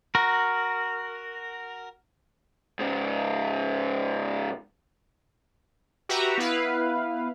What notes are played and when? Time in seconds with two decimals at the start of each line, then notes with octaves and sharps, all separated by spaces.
0.15 F#4 A#4
2.79 G#2 C#3
6.09 F#4 G4 B4 E5 A#5
6.38 B3 E4 B4 F5